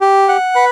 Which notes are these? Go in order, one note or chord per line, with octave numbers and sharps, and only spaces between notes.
G4
F#5
B4